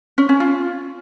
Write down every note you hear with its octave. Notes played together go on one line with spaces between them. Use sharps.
C#4
C#4
F4